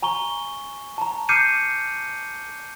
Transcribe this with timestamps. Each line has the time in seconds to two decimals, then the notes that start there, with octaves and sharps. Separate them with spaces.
0.02 G#5 A#5 C#6 G7
0.98 A5 A#5
1.29 D6 F6 G6 C7 C#7 D#7